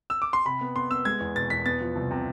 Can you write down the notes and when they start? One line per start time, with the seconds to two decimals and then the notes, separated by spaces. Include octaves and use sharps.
0.10 E6
0.22 D6
0.33 C6
0.45 C3 B5
0.61 B3
0.76 B3 C6
0.91 B3 E6
1.05 G#3 G#6
1.20 E2
1.35 B2 A6
1.50 E2 B6
1.65 B3 A6
1.81 F3
1.96 C2
2.11 C3